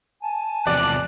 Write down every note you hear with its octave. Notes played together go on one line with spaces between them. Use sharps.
G#5 A5
E2 C3 F3 D5 F#6